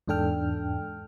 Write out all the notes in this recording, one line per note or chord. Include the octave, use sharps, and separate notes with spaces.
E2 G#2 D4 A4 G5 F6